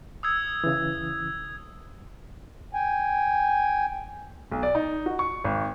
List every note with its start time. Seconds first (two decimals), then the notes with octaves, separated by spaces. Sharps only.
0.23 D#6 E6 G#6
0.64 C#3 E3
2.74 G5 G#5
4.51 B1
4.63 D5
4.75 D#4
5.06 F#4
5.19 C#6
5.44 G#1